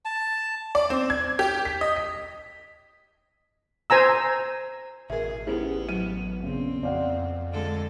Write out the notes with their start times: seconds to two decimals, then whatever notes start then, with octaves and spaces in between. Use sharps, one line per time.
0.05 A5
0.75 D5
0.90 C4
1.10 G#6
1.39 G4
1.65 B6
1.81 D#5
1.96 B6
3.90 C5 G#5 A#5 E6
5.10 A1 B2 G#4 A#4 E5
5.47 B3 C#4 E4 G4 G#4 C5
5.89 F#3 D#7
6.40 E2 A#2 C#3 C4
6.83 F2 D5 F5 F#5
7.52 D3 G#3 A4